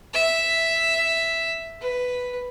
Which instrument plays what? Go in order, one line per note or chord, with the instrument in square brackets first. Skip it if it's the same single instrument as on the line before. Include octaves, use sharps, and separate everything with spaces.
[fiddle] E5
B4